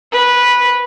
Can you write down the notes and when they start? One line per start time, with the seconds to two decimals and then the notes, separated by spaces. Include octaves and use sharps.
0.12 B4